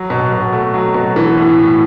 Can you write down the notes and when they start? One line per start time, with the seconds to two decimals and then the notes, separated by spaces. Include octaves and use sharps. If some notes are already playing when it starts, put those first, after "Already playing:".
Already playing: F#3
0.10 B2
0.32 B2
0.53 A3
0.74 F#3
0.94 B2
1.16 E3
1.37 A2
1.58 A2